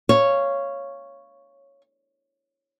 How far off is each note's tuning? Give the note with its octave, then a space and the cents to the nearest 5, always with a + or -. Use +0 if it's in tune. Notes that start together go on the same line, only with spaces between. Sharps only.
C#5 +0 F5 -15